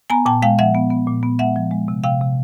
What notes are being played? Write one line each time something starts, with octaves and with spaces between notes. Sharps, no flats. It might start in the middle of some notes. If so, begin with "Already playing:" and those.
B3 G#5 A#5
A#2 G5 A5
G#3 F5 G5
F3 E5 F#5
B3
B3
A#2
B3
G#3 E5 F#5
F3
G#3
C3
C3 F5 G5
C3